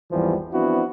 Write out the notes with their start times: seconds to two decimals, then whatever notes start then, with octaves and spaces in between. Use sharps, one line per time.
0.11 G#1 E2 E3 F3 G3
0.52 F3 B3 C4 D4 E4 F#4